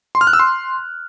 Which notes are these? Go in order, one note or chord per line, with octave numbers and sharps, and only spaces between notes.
C6
F6
F#6
E6
C6